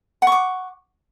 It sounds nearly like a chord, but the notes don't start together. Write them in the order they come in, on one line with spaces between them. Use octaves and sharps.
F#5 C#6 D6